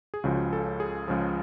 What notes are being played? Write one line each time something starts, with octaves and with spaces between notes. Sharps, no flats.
G#4
C#2 C#3 F3 F#4
A4
G#4
C#2 C#3 F3